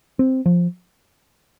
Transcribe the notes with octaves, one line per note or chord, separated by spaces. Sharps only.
C4
F3